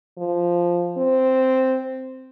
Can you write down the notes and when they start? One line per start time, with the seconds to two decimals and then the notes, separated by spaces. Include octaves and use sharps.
0.18 F3
0.98 C4